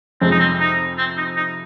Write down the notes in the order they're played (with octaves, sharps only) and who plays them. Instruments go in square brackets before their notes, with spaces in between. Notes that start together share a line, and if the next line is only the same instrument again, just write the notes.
[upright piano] F2 C3 G#3 [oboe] C4
[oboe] D#4
C4
D#4
C4
D#4
D#4